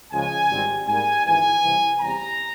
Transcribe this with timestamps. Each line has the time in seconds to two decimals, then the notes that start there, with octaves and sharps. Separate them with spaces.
0.12 C#2 C#3 F3 G#3 G#5
0.50 G#1 G#2 G3 C4
0.87 G#2 G3 A#3 G#5
1.25 G#1 G#2 E3 G#5
1.63 C2 C3 E3
2.00 E2 C3 G3 A#5